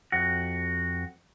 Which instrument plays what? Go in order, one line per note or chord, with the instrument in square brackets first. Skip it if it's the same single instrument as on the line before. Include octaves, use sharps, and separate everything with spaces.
[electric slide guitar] F2 F#4